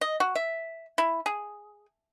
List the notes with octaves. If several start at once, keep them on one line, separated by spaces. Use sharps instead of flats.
D#5
F#4
E5
E4
G#4